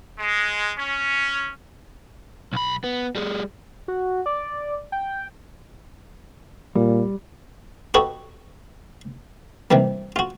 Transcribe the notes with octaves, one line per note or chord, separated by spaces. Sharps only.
G#3
C#4
B1 B5
B3
G3 G#4
F#4
D5
G5
A#2 G3
F#4 G4 A4 B4 C#5 D#5
C3 D#3 E3 G3 A#3
F4 F#4